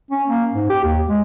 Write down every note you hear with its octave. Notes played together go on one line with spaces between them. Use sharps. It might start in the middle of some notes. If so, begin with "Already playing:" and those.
C#4
A#3
G#2
G4
D#2
G#3